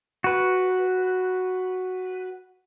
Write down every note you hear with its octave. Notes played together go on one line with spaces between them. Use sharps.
F#4 B4